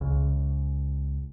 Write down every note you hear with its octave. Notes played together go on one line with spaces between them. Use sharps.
C#2